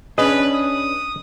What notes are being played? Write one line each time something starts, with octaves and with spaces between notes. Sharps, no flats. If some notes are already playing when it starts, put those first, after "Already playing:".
C#4 D4 G#4 B4 D#5
D#6